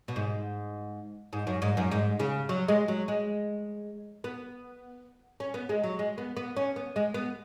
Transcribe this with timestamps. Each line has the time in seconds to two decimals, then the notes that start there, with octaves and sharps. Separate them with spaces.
0.08 B2
0.16 G#2
1.33 G#2
1.47 F#2
1.62 G#2
1.77 F#2
1.91 G#2
2.20 C#3
2.49 F#3
2.68 G#3
2.88 F#3
3.08 G#3
4.24 B3
5.40 C#4
5.54 B3
5.69 G#3
5.84 F#3
5.99 G#3
6.18 B3
6.37 B3
6.56 C#4
6.76 B3
6.96 G#3
7.14 B3